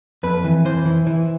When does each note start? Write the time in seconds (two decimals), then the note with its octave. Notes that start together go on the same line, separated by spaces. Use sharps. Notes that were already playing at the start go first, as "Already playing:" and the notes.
0.23 F2 B4
0.44 E3
0.65 E3 C5
0.86 E3
1.07 E3